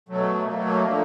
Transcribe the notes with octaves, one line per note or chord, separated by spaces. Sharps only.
B2 F#3 A3
B2 F#3 A3 A#3
A#3
D3 F3 A3